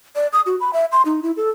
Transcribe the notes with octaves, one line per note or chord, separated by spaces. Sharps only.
D5
D#6
F#4
B5
E5
C6
D#4
E4
A4